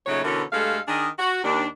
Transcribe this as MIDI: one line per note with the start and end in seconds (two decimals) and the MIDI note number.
0.07 0.23 46
0.07 0.23 49
0.07 0.23 54
0.07 0.23 57
0.07 0.23 63
0.07 0.23 73
0.24 0.43 47
0.24 0.43 50
0.24 0.43 52
0.24 0.43 61
0.24 0.43 69
0.24 0.43 70
0.52 0.79 43
0.52 0.79 56
0.52 0.79 57
0.52 0.79 69
0.52 0.79 77
0.88 1.08 51
0.88 1.08 62
0.88 1.08 68
0.88 1.08 70
0.88 1.08 75
1.18 1.39 66
1.44 1.65 39
1.44 1.65 62